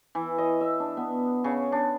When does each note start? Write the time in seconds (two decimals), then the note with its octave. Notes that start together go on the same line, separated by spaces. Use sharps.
0.15 E3
0.38 D#5
0.61 E5
0.80 D4
0.97 B3
1.44 C#3
1.72 D4